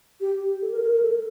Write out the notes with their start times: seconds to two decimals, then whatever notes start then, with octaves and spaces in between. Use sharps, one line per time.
0.21 G4
0.62 A4
0.72 A#4
0.82 A#4
0.92 A#4
1.02 A4